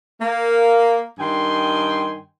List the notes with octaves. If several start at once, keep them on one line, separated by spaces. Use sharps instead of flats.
A#3
G2 D#3 G5 G#5 C6